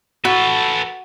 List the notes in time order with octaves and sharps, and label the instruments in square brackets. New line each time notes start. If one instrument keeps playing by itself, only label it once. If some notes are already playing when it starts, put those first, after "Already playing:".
[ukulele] F#4 [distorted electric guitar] A4 B4